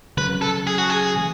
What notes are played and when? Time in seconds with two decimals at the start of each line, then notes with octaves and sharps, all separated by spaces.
0.17 C#3 F#3 C#4 B4
0.42 A4
0.67 G#4
0.78 F#4
0.90 G#4
1.16 C#3 E3 A3